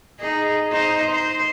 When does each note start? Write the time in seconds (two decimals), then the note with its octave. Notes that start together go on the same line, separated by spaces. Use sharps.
0.19 D#4 G#4
0.71 D#4 C5
1.11 C5